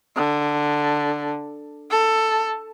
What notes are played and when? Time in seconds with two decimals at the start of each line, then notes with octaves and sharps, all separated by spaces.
0.16 D3
1.90 A4